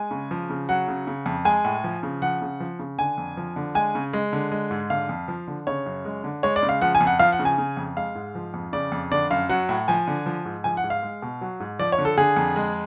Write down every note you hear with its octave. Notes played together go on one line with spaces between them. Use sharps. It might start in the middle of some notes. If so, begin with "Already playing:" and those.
Already playing: G#3 G#5
C#3
F3
C#3
F#3 F#5
C#3
C#3
F2
G#3 G#5
A2
F3
C#3
F3 F#5
C#3
F3
C#3
D3 G#5
F2
F3
D3
G#3 G#5
C#3
G#3
D3
G#3
G#2
D3 F5
F2
F3
D3
C#3 C#5
F#2
G#3
D3
G#3 C#5
D5
C#3
F5
F3 F#5
G#5
F2
F#5
F3 F5
F#5
C#3
G#5
C#3
F2
G#3 F5
G#2
F3
F2
C#3 D5
F2
D3 D5
F#2 F5
F#3 F#5
A2
F3 G#5
D3
F3
G#2
F3 G#5
F#5
G#2
F5
G#3
B2
F#3
G#2
F3 D5
C#5
D3
A4
D3 G#4
F2
G#3